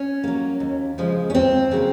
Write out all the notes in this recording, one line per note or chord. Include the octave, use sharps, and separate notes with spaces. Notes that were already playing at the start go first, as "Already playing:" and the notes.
Already playing: C#4
F#3 A#3
D#2
C#3 F3 G#3
C#4
D#2 C4
C#3 F#3 A#3